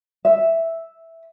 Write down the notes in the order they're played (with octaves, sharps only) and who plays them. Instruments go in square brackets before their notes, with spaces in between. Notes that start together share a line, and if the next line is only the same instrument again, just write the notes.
[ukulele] E5